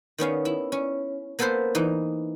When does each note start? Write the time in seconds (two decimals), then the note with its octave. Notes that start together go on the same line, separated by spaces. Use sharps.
0.18 D#3 B3 C#4 F5
0.45 E4
0.72 C#4
1.39 A#3 B3 A4 B4 C5
1.75 E3 D#4